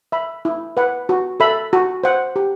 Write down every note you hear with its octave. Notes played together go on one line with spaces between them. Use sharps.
E5 B5
E4
B4 F#5
F#4
A4 E5 B5
F#4
C5 F#5
G4